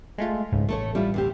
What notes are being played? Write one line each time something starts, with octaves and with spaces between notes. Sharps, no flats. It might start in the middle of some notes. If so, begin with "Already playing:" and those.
G#3 A3 F4
C#2 G#2
A1 A3 A4 C#5
G3 E4 F4
D2 C4 G4